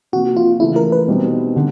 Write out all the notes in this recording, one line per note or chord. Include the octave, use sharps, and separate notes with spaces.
C3 F3 A#3 F#4
F4
C#3 E3 A3 E4
A#4
B4
B2 G3 C4 D#4
D3